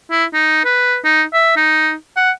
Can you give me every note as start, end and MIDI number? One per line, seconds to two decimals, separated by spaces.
0.11 0.25 64
0.33 0.62 63
0.65 0.98 71
1.04 1.24 63
1.33 1.54 76
1.57 1.94 63
2.17 2.31 78